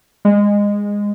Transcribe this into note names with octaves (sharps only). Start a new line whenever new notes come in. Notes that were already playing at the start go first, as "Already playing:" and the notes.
G#3